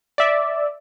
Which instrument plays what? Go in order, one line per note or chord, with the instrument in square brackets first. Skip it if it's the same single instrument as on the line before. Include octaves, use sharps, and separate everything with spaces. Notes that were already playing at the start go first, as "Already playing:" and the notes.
[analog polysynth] D5 E5